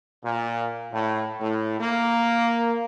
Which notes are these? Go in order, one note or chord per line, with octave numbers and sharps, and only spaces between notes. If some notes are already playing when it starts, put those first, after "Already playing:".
A#2
A2
A2
A#3